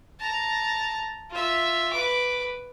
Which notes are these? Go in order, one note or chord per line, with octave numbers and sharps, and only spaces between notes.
A5 A#5
F4 E5
B4 D6